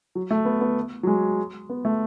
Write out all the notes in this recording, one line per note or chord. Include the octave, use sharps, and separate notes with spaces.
F#3
A3
B3
B3
F#3
G#3
B3
A3